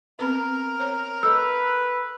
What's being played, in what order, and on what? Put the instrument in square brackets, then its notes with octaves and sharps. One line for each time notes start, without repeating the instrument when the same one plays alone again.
[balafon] B3 C4 B4 [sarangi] A#4
[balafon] C5 C#5 A#5
[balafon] A4 D#5 [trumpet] B4 [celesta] E6